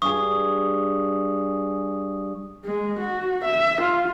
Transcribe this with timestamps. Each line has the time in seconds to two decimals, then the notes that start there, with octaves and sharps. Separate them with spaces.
0.02 G2 G#4 C#6 D#6
2.65 G#3
2.99 F#4
3.45 E5
3.82 F4